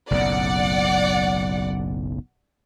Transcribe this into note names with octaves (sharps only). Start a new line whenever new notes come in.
F#1 B1 A2 D5 F#5